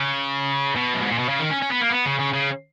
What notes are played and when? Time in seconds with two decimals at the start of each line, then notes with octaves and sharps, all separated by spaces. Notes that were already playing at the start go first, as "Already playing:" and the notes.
Already playing: C#3
0.75 B2
0.94 F#2
1.02 G#2
1.10 A#2
1.18 B2
1.29 C#3
1.40 D#3
1.51 C#4
1.62 C#4
1.72 B3
1.81 A#3
1.90 B3
2.06 C#3
2.19 C#3
2.33 C#3